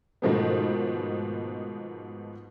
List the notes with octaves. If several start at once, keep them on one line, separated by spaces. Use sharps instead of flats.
G#2 B2 D#3 F3 A3 B3